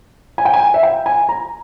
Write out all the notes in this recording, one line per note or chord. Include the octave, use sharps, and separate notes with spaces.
G#5
G5
G#5
E5
G5
G#5
A#5